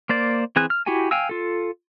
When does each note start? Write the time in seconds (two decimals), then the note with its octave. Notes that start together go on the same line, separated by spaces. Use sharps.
0.09 A#3 C5 D5
0.56 E3 C4 G#4 G#5 F#6
0.70 F6
0.86 E4 F#4 G4 G5 G#5
1.11 F5 G5 G#5 E6
1.29 F4 A4